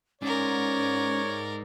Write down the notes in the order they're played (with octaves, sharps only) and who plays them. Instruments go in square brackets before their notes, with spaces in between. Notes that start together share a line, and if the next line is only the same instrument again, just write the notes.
[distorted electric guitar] G#2 [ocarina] C#4 [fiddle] A#4 D5 [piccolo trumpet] C#5